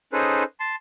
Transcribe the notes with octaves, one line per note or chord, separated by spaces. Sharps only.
C#4 D#4 G#4 A4 B4 C5
A5 C6